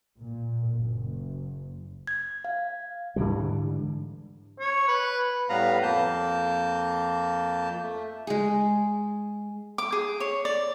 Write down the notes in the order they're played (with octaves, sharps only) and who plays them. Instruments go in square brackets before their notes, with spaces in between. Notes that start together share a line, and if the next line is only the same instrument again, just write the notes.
[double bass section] A#2
F#1
[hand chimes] G#6
F5
[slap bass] G#2 D3 E3 G3
[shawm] C#5
B4
[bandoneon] A2 G3 B3 B4 F5 A#5
F2 A#3 A5 G6
A3
[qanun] G#3 G#4
[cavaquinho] D6
G#4
C#5
D5